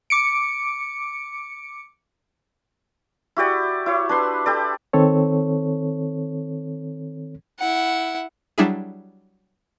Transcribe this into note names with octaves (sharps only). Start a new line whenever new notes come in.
D6 C#7 D7
E4 F#4 G4 D5
E4 C#5
D4 B4 C6
G4 A4 D5
D#3 C4 A4 C#5
E4 F#5
F#3 G3 D4 E4 G#4